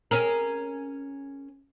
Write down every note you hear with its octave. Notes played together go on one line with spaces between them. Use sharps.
C#4 G#4 A#4